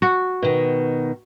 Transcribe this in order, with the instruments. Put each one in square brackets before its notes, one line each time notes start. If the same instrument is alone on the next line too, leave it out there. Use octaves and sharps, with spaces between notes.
[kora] F#4
[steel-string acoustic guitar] B2 D#3